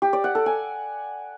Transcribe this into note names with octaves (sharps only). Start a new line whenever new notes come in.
G4
D5
F#5
A4
G#5